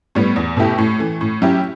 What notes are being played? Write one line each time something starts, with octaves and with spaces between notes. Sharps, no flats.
A2 G3 B3
E2
B2 A3 E4 G4
A2
E3 A3
A2
F#3 C#4 E4 G4